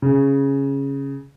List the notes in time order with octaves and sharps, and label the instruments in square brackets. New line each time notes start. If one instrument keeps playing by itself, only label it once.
[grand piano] C#3